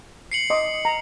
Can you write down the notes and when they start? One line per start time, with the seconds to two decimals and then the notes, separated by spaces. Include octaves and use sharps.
0.32 C7 C#7 F#7
0.50 D#5 C6 D6
0.85 A#5